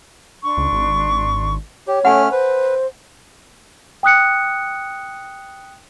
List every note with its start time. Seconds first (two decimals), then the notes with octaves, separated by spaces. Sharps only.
0.44 D4 C6 C#6
0.57 C#2
0.73 G#1
1.87 G4 C#5
2.05 A3 C#4 F#5 G#5 F6
2.31 B4 C5
4.03 G5 D#6 F#6 C#7